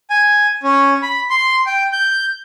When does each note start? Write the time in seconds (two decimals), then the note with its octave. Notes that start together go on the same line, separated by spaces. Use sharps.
0.10 G#5
0.63 C#4
1.02 B5
1.30 C6
1.66 G5
1.92 G6